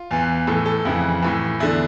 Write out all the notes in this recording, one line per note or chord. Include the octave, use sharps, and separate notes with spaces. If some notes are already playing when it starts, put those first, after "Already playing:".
Already playing: F4
E2 E3
A2 E3 A4
A4
F2 C#3 E3 E4
A2 E3
E2 D3 E4